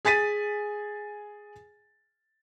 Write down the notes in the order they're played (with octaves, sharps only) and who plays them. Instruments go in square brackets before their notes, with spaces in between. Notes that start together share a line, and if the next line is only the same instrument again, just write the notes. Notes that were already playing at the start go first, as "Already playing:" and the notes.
[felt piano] G#4 G#5 A6 B6 D#7